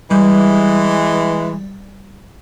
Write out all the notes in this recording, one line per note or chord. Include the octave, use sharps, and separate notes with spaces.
E3 G3 G#3